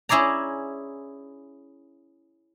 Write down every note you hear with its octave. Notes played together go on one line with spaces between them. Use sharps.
C#4 E4 G#4 D5 A#5